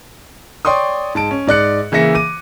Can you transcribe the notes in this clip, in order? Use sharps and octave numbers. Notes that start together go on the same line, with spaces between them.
C#5 D5 G5 C6 C#6 D#6
G#2 A5 D7
C#4
G#2 D5 F#6 C#7
C#3 E3 A#3 E5 A#6 C#7
D6 D#7